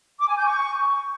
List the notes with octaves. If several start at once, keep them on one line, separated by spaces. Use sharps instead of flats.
D6
G#5
G6
C#6